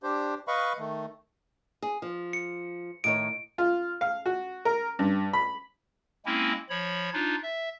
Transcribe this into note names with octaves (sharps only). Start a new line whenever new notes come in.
D4 G4 C5
B4 D#5 F5 B5 C#6
D#3 A3
G#4
F3
C#7
A2 D#3 C#5 D7
F4
F5
F#4
A#4
G2
B5
G#3 A#3 C4 C#4 E4
F3 C#5 B5
D4 D#4 F4
E5